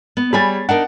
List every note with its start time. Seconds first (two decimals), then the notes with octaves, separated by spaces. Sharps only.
0.17 B3
0.33 G3 G#4 C#5 G#5 B5 A6
0.69 D4 D#4 A#4 F#5